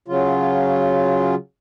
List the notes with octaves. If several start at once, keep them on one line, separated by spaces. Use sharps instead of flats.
C#3 F#3 F4